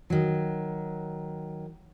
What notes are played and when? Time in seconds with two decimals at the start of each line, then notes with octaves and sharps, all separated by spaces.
0.10 D#3 F#3